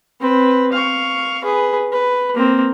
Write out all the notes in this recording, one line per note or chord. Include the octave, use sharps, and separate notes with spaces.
C4 B4
F5 C#6
G#4 B4
B4
A#3 C4